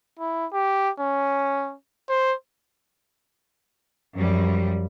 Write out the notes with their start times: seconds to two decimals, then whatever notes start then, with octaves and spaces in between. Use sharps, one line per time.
0.19 E4
0.53 G4
1.00 C#4
2.09 C5
4.16 F#2 F3 G3